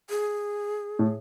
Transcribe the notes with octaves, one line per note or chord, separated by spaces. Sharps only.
G#4
A2